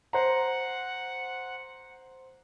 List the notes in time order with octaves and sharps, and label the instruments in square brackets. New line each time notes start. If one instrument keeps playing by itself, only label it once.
[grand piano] C5 A#5 [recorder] F#5